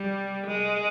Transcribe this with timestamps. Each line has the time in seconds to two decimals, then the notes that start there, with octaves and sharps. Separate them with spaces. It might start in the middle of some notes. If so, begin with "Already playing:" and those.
Already playing: G3
0.47 G#3